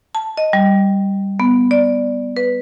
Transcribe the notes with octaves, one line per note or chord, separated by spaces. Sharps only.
A5
D#5
G3
B3
D5
B4